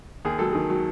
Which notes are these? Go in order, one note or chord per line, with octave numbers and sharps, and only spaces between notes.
D#2 G#4
F#3 A4
D#3 G#4
F#3